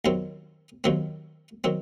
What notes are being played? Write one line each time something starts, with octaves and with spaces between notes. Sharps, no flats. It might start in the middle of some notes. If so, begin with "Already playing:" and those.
D#2 D#3 F#3 C4
D#2 D#3 F#3 C4
D#3 F#3 C4